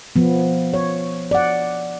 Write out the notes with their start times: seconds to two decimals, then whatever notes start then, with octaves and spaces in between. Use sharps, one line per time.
0.16 F3 B3
0.74 C#5
1.31 D5 F#5